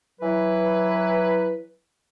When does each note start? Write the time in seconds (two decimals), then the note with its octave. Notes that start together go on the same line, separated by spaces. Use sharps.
0.21 E3 F#3 E4 B4